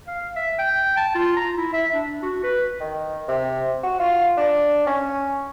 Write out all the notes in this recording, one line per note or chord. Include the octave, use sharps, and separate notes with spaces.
F5
E5
G5
A5
F4
A#5
E4
E5
D4
F#4
B4
D#3
C3
F#4
F4
D4
C#4